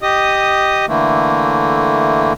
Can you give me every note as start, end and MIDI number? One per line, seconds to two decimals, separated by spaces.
0.02 0.86 67
0.02 0.86 75
0.02 0.86 87
0.88 2.33 50
0.88 2.33 52
0.88 2.33 57
0.88 2.33 58